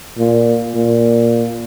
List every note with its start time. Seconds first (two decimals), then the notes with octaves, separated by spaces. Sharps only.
0.17 A#2
0.75 A#2